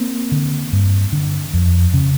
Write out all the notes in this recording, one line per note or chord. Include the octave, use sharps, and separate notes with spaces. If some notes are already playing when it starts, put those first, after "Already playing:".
Already playing: A#3 C4
D3
G2
D3
F2
C#3